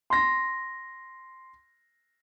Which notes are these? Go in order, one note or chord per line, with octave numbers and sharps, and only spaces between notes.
C6 A#6